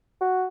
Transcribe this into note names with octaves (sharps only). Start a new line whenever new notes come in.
F#4